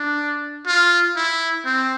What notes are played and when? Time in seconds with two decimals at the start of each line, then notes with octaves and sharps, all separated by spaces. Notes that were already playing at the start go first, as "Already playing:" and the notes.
Already playing: D4
0.66 F4
1.16 E4
1.65 C4